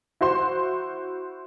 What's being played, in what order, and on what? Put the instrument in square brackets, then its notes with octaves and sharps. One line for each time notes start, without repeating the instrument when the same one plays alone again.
[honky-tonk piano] E4 F#4 C5 C6